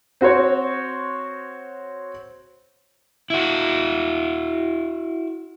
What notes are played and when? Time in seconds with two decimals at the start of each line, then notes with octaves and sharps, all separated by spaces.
0.21 C4 F#4 C5 C#5
3.30 E4 F#4